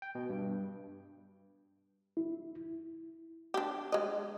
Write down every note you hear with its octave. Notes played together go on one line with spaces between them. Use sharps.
G5
B2
G2
E4
D4 G4
G#3 D#5